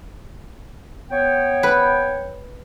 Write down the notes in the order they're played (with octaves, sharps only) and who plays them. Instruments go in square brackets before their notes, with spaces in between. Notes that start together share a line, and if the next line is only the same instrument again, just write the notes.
[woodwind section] B3 C#5 G5
[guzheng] B4